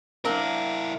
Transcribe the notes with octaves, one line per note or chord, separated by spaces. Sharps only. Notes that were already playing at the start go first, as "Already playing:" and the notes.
A#3 C4 D4 E4 A#4